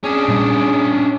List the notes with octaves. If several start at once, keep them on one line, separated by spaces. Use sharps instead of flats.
C#4 D4 G#4 D#6
A#2 G3